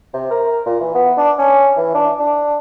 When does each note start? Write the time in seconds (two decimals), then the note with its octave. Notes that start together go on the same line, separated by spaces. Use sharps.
0.14 C3
0.31 A#4
0.66 A#2
0.80 E3
0.95 B3
1.17 D4
1.38 C#4
1.77 E3
1.94 D4
2.19 D4